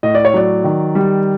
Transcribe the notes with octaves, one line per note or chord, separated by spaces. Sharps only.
A2 D#5
D5
C#5
F#3 D5
D#3
G3